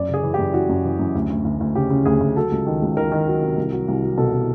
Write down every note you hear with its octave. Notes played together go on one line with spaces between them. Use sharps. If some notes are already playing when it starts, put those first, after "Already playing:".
Already playing: F#2 D5
C#3 G#4
E3
F#2 G4
E3 F#4
F#2
E3
F#2
D2
D2
D2
D2
C#3 G4
C#3
D2 G#4
D2
F#3 A4
C#2
D#3
C#2
D#3 A#4
D#3
F#3
C3
C2
F#3
C2
F#3
B2 A4
B2